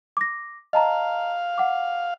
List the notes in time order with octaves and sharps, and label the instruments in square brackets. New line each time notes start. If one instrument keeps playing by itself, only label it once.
[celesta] D6 A#6
[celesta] D#5 A5 A#5 [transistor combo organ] F5
[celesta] F#5 D6